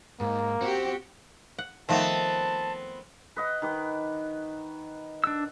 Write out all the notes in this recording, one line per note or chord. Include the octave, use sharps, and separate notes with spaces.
G#2 A#3
C4 F#4 G4
F#5
D#3 F3 A3 B3 C4 A5
B4 D#5 F#5
D#3 B4 D6
D4 F#5 E6